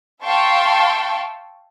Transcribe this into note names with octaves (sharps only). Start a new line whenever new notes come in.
E5 F5 G5 A5 C6 C#6